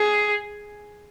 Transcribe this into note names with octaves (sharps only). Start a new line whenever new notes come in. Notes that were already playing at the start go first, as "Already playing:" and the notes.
Already playing: G#4